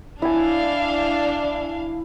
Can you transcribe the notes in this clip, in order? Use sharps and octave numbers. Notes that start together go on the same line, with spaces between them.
D4 E4 D5 F5 G#5